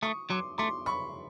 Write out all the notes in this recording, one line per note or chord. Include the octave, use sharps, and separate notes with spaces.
A3 C#6 D#6
F#3 C6 D6
A3 C6 D6
B5 C#6